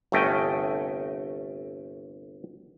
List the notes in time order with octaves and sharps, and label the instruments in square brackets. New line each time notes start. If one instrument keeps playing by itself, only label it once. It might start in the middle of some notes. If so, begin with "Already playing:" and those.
[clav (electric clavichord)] G1 C2 A3 C#4 D#5 G5